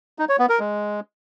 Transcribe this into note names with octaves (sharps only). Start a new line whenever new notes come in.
D#4
C#5
B3
A#4
G#3